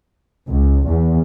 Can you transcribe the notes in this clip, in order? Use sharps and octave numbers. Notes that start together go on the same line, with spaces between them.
C#2
E2